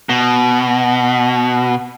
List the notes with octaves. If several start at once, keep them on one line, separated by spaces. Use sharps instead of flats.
B2